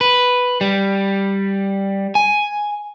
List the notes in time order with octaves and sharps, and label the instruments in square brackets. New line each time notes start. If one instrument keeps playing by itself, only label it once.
[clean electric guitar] B4
G3
G#5